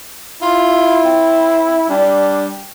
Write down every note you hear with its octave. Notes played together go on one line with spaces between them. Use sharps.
E4 F4
C4
G3 D4